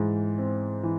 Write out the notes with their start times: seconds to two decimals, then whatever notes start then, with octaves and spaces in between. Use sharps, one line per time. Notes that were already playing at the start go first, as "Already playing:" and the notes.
Already playing: G#2 E3
0.38 C4
0.83 E3